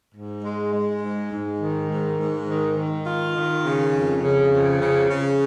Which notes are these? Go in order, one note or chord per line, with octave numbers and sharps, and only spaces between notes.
G#2
G#3
G#3
G#2
G#2
D#3
G#2
G#2
D#3
D#3
F4
D#3
C#3
F2
C#3
F2
C#3
C#3